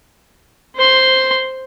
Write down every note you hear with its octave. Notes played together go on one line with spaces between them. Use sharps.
C5 C6